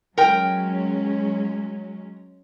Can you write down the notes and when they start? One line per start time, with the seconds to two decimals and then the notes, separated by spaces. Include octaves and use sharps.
0.18 F#3 G#3 C#4 A#4 G5